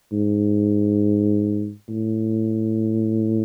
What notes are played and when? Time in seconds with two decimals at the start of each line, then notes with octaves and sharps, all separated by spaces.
0.13 G#2
1.89 A2